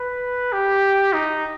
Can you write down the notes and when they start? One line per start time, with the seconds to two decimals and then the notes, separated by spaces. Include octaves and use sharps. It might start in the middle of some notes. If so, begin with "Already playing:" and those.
Already playing: B4
0.52 G4
1.13 D#4